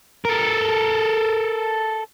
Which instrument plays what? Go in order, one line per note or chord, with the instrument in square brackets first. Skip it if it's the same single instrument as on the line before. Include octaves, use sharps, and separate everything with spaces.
[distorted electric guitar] A4 A#4